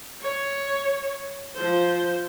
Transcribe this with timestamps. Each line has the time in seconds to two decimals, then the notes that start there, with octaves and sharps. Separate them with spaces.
0.21 C#5
1.55 F3 C5